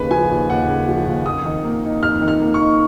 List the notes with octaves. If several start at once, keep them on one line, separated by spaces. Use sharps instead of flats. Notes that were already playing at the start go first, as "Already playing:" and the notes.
Already playing: D#2 C#3 B4
F3 G#5
D#2
D#2 F#5
C#3
F3
D#2
F2 D#6
D#3
A#3
D#4
F2 F6
D#3
F6
A#3
C#6
D#4